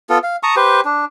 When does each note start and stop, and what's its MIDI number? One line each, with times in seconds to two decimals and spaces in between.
0.10 0.18 59
0.10 0.18 65
0.10 0.18 69
0.23 0.36 77
0.43 0.55 81
0.43 0.55 82
0.43 0.55 85
0.43 0.55 87
0.56 0.81 67
0.56 0.81 71
0.56 0.81 72
0.85 1.05 62